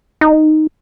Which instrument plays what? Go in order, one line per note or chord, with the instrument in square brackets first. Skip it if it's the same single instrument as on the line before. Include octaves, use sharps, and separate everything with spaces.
[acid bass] D#4